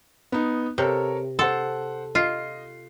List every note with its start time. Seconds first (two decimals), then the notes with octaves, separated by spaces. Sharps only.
0.32 B3 D#4
0.78 C3 A4 A#4 C#5
1.39 A4 C5 F#5 C6
2.15 F4 D#5 C7